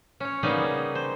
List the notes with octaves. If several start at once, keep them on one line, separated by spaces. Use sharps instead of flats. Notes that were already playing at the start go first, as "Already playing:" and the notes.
C#4 C#5
C#3 G3 A#3 B3 D#4 G#4
C5